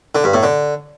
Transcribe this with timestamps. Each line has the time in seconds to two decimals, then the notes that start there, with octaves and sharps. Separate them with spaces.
0.15 D3
0.24 G2
0.34 A2
0.43 D3